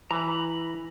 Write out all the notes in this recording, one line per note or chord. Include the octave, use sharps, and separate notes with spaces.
E3 A#5 B5